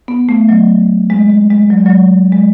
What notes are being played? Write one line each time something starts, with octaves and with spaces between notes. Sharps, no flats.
B3
A3
F#3
G#3
G#3
G#3
F#3
G#3
F#3
G#3